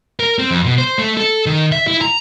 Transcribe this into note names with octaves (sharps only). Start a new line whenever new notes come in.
A#4
C4
F2
B2
C5
A3
A4
D#3
E5
E4
A#5